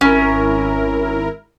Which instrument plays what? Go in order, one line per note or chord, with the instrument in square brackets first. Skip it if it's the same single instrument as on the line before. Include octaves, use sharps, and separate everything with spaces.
[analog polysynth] G#1 E4 A#4 [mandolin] C#4